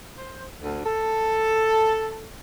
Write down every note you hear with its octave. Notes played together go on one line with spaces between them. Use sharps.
C5
D2
A4